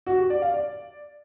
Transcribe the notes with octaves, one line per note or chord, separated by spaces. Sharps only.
F#4
G4
D5
F5
D5